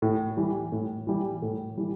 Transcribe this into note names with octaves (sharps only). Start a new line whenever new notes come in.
A2
E3 G3
A2
E3 G3
A2
E3 G3